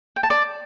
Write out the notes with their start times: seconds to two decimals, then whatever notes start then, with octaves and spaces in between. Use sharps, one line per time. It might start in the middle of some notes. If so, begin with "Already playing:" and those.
0.16 G5
0.23 A5
0.30 D5